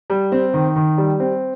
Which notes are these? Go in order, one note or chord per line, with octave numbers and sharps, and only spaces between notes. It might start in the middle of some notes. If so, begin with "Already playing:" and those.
G3
C4
D#3
D#3
G3
C4